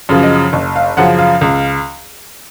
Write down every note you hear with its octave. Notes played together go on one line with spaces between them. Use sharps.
F#2 C#3 F3
D#5
F#1
F5
F#2 C#3 F3 F#5
F5
C#2